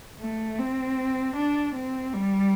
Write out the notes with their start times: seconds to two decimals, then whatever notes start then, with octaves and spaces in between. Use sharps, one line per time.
0.20 A3
0.59 C4
1.36 D4
1.75 C4
2.13 G3